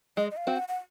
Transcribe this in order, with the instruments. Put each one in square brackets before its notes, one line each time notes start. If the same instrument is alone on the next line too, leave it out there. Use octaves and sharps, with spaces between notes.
[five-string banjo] G#3 [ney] D#5
[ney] D#5
F5
[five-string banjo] C4 F#4
[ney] F#5
F#5